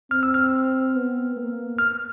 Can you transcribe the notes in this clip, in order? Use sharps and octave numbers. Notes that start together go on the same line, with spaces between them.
C4 F6
E6
F6
B3
A#3
F6